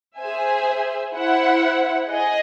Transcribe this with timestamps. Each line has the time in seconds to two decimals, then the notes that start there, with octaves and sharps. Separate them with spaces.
0.19 G#4 C5 E5 G#5
1.14 E4 C5 F#5
2.10 G#4 D#5